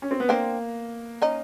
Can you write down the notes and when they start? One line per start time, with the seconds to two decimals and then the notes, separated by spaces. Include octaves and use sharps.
0.02 C#4
0.11 C4
0.20 B3
0.29 A#3 C4 D4
1.22 C#4 D#4